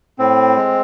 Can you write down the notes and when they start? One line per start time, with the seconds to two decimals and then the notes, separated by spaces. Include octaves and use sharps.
0.19 A2 C4
0.57 G#3